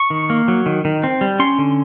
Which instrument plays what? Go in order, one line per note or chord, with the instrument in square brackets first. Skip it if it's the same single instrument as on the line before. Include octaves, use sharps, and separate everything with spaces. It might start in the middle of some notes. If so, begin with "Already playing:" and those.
Already playing: [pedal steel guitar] C#6
D#3
A#3
F#3
D#3
D#3
C4
G3
C#4 C6
D3